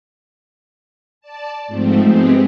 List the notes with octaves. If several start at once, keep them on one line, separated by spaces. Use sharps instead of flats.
D5 A5
G#2 F3 A3 C4
G#3 B3 C4 G4 G#4